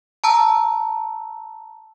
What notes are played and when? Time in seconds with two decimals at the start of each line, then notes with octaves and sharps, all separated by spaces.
0.24 A5 A#5 E6